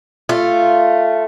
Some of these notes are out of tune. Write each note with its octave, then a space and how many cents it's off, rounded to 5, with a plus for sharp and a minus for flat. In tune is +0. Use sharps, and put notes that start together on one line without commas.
A3 +0 F4 -10